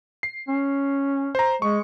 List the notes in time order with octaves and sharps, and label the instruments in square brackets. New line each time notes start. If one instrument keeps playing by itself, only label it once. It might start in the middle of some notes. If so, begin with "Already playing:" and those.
[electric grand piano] C7
[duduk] C#4
[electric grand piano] C5 A#5
[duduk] G#3 [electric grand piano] C#6